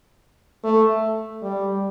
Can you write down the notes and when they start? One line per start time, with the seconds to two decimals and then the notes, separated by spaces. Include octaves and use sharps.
0.64 A3
1.43 G3